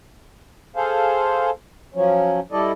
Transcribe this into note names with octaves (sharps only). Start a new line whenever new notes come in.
G#4 A4 C5 F5
F3 F#3 C#4
G3 E4 A4 D5 D#5